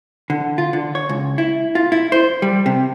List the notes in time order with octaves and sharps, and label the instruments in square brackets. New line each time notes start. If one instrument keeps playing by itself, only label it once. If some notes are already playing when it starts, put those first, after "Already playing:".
[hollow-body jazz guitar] D3
F4
D3
C#5
C#2
E4
F4
E4
C5
G3
C3